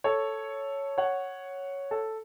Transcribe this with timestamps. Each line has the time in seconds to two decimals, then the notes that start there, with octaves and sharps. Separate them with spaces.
0.04 A4 C#5
0.98 C#5 F#5
1.91 A4